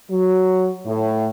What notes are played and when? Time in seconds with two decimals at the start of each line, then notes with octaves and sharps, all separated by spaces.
0.11 F#3
0.86 A2